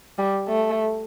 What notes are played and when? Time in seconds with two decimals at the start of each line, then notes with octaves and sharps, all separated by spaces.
0.18 G3
0.48 A3